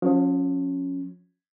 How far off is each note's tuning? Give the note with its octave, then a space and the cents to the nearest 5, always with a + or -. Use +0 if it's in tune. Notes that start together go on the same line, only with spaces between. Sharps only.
F3 +35 C#4 -5